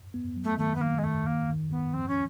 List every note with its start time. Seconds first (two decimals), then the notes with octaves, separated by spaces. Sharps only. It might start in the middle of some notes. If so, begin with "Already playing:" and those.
0.14 B3
0.36 F#3
0.44 A3
0.58 D#3 A3
0.75 B3
0.81 D#3 A#3
0.98 G#3
1.03 D#3 A3
1.26 D#3 A#3
1.49 D#3
1.71 D#3 B3
1.93 F3 C4
2.08 C#4